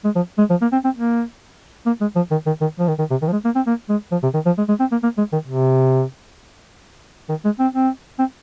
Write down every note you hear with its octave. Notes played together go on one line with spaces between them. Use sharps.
G#3
F3
G#3
F3
A#3
C4
C4
A#3
A#3
G#3
F3
D#3
D#3
D#3
F3
D#3
D#3
C3
D#3
F3
G#3
A#3
C4
A#3
G#3
F3
C3
D#3
F3
G#3
G#3
C4
A#3
A#3
G#3
D#3
C3
D#3
G#3
C4
C4
C4